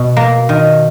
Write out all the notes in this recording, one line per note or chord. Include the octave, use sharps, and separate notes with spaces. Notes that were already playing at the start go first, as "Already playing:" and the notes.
Already playing: B2
A#3
D#3